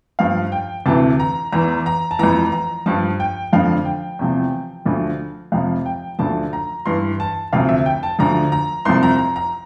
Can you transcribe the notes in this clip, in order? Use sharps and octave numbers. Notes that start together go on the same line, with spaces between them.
G2 F3 F5
G5
D2 C3 E3 A5
A#5
E2 E3 A#5
A#5
A5
F2 E3 A#5
A#5
G2 F3 A5
G5
F2 D3 F3 F5
G5
E2 C3 F3
D2 D3 F3
F2 C3 F3 F5
G5
D2 D3 F3 A5
A#5
G2 E3 C6
A5
D2 C3 F3 F5
E5
G5
A5
D2 D3 F3 A#5
A#5
C2 C3 F3 C6
A#5
A#5
A#5